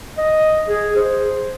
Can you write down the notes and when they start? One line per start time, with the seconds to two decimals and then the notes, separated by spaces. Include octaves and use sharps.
0.18 D#5
0.68 G#4
0.96 C5